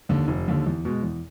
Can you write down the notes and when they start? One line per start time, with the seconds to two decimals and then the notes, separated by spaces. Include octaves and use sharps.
0.09 D#2 D3
0.28 F1
0.48 D#2 D3
0.66 E2
0.85 B2 G#3
1.03 E2